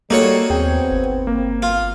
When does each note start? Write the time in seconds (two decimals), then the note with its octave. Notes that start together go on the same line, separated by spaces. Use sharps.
0.10 G3 A#3 D#4 F#4 A4 C#5
0.50 D#2 B3 C4 G#4 G5
0.91 G1
1.27 A#3
1.62 F4